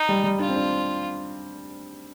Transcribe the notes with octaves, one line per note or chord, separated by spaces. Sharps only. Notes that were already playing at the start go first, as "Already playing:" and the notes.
Already playing: D#4
G3
G3
D4 F4
C4
D4